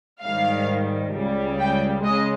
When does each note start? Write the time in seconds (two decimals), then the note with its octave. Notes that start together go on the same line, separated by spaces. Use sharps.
0.23 G#2 D#3 G3 F5
1.14 C#2 C#3 G3
1.59 G5
2.04 C#3 G#3 D#5